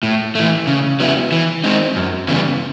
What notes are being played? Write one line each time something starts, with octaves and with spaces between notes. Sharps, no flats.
A2
E3 A3
C#3
F#3 B3 E4
E3
G#3 C4 D#4
F#2
C#3 E3 G3 B3